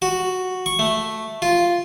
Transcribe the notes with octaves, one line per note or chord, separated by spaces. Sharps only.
F#4
C#6
A3
F4